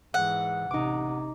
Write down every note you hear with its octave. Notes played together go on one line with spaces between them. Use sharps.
G#2 E3 F#5
A1 C3 D#4 D6